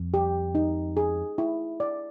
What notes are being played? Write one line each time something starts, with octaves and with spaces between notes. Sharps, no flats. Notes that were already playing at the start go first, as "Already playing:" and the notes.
Already playing: F2
G4
D#4
G#4
E4
D5